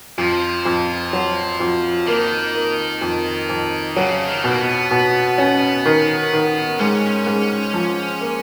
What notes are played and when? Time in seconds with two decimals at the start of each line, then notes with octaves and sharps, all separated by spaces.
0.18 F2 F3
0.65 F2
1.13 F#3
1.60 F2
2.07 D#3 A#3
2.55 A#3
3.01 F2
3.49 F2
3.96 C#3 F#3
4.28 D#3
4.44 B2
4.49 A#3
4.59 B3
4.91 B2
5.38 C#4
5.85 D#3
6.33 D#3
6.79 G#2 C#4
7.27 G#2
7.74 F3
8.21 A#3